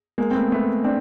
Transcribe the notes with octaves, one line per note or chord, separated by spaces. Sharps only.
G#3 A#3
C4
A3 B3
A3 B3
C4 D4